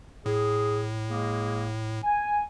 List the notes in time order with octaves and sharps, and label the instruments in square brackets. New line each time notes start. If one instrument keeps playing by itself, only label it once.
[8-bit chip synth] A2 [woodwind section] G#4
[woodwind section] G#3 A#3 G#4
G#5